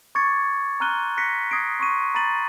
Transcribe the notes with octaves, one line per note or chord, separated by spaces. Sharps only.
C#6 D6 G#6 A6 C#7
A#5 C6 F6 F#6 D#7 G7
F#6 A#6 B6 C#7
D#6 G#6 A#6 C7 D7
C6 C#6 D#7
A#5 B5 A6 D#7 F#7